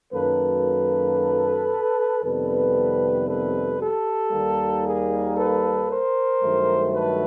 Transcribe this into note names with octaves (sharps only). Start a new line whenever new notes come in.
F#2 D#3 F#3 A#3 A4 B4
F2 C3 D#3 G3 B3 A4 B4
A4 B4
G4 A4
D#2 D#3 G3 A#3
G#4 A#4
A4 B4
A#4 C5
G2 D#3 F#3 A3
A4 B4